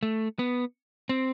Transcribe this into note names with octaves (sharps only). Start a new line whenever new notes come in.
A3
B3
C4